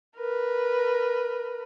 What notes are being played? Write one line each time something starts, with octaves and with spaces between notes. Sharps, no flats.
A#4 B4